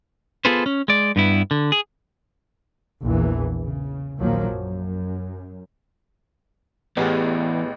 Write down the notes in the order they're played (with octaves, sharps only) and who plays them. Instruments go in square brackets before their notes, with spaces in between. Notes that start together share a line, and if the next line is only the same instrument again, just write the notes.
[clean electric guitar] B3 F4 G#4 A4 B4 C5
C#4
G#3 D5
G2 B3 E4
D3
G#4
[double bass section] A#1 E2 E3
C#3
A#1 D#2 A#2 F3 F#3 A#3
F#2
[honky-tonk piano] A1 [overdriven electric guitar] E2 [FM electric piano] B3 G4 G#4